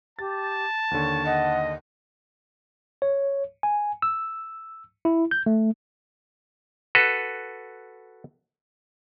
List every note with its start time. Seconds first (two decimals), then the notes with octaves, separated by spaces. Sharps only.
0.19 G4 A5 A6
0.91 D#2 D3 C#5
1.25 D#5 F#5
3.02 C#5
3.63 G#5
4.02 E6
5.05 E4
5.31 G6
5.46 A3
6.95 F#4 A4 B4